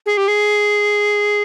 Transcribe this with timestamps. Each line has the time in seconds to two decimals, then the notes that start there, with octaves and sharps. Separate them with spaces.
0.06 G#4
0.17 G4
0.28 G#4